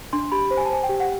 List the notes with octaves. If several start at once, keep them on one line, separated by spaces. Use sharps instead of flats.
D4 C6
G4 B5
C5
G#5
A5
C5 G#5
G5
G4
F#5